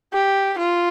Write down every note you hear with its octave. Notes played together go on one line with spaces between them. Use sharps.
G4
F4